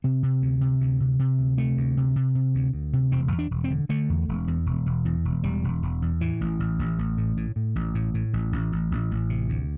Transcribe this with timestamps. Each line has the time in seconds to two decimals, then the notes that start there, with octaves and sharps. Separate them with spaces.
0.04 C3 C4
0.23 C3
0.42 D2
0.61 C3
0.80 D2
1.00 C3
1.19 C3
1.39 D2
1.58 C3 A3
1.77 D2
1.97 C3
2.16 C3
2.35 C3
2.55 D2
2.73 D2
2.93 C3
3.12 E1 C4
3.32 E2
3.39 D4
3.51 E1
3.64 C4
3.70 D3
3.89 D3 A3
4.09 E2
4.29 E1
4.47 E2
4.66 E1
4.86 E1
5.05 E2
5.25 E1
5.44 E1 G3
5.64 E1
5.83 E1
6.02 E2
6.20 A2 E3
6.41 A1
6.60 A1
6.79 A1
6.98 A1
7.18 A2
7.37 A2
7.56 A2
7.76 A1
7.95 A2
8.14 A2
8.33 A1
8.52 A1
8.72 A1
8.91 A1
9.11 A1
9.30 C3
9.49 D2